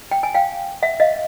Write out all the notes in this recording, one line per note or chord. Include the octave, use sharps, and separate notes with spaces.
G5
G#5
F5 G5
E5 F#5
D#5 F5